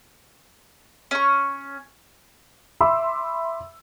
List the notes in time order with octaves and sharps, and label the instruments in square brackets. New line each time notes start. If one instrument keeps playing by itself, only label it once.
[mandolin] C#4 C#6
[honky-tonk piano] E5 B5 C6 D6 E6